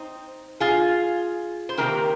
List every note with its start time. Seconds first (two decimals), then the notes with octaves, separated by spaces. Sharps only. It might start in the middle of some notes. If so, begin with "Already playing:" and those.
Already playing: C4 D#4
0.60 F4 G#4
1.69 C5
1.77 C3 D#3 A#3 G4 A#4